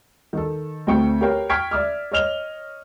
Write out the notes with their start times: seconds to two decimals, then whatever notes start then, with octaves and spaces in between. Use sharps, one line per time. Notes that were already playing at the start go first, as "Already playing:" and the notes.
0.33 D#3 A4
0.87 D2 A3 C4 G5 C#6 C#7
1.21 G4 A#4 B4 C#5 F5 G5
1.49 G5 C#6 F6 G#6 B6 D7
1.71 D5 E5 D6 F6
2.12 C#5 D#5 F6 F7 G7